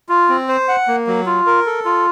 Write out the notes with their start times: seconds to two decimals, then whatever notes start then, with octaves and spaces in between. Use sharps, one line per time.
0.09 F4
0.29 C4
0.48 C5
0.68 F#5
0.88 A#3
1.07 F#3
1.26 F4
1.46 A#4
1.66 A4
1.85 F4